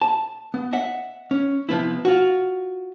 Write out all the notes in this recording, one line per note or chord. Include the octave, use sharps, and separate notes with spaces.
A5
B3
D#5 E5 F#5
C#4
C3 F3 B3 E4
F4 F#4